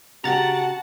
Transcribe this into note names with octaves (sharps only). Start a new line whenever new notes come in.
C#3 F#4 G4 F#5 A5 A#5 A6